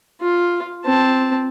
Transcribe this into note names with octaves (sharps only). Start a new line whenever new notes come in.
F4
C4 A5